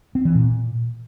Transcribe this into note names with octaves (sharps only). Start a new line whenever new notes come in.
C4
E3
A#2